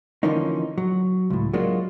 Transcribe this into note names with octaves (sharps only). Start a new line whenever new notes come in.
D3 E3 F3 A#3 C#4 D#4
F#3
C#2 A2
F#3 G#3 A#3 D4 F4